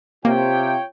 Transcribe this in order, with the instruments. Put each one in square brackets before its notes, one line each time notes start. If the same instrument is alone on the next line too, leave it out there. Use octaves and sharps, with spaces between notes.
[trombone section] C3 [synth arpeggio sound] A#3 [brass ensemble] F4 C#5 G5